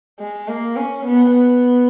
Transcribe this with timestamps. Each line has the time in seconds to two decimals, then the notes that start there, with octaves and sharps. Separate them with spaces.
0.20 G#3
0.48 A#3
0.77 C#4
1.06 B3
1.35 B3